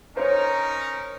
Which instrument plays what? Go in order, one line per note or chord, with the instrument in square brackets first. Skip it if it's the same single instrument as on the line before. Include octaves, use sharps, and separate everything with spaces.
[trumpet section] C#4 D#4 A#4 [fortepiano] C5 C#5